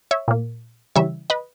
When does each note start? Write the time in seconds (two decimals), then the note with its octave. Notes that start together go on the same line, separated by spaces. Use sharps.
0.11 C#5 E5
0.28 A#2 A#3
0.96 C#3 E3 G3 C#5 E5
1.30 B4 D#5